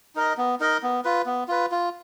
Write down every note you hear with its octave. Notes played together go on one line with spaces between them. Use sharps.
D#4 A#4 D#5
B3
D#4 A#4 D#5
B3
F4 B4
B3
F4 B4
F4